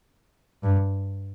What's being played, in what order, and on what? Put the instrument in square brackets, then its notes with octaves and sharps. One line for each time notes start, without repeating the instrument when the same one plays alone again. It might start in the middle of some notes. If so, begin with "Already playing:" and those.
[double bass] G2